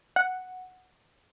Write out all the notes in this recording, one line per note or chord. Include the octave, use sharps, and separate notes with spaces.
F#5